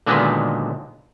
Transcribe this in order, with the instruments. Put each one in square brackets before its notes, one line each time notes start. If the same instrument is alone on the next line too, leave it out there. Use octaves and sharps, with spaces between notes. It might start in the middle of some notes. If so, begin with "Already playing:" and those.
[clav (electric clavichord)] A#2 D3 D#3 F#3 G#3 B3